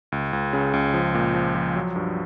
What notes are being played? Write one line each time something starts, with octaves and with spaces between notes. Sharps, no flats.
C#2
C#2
C#3
C#2
F3
A#2
F3
F3
F#3
G2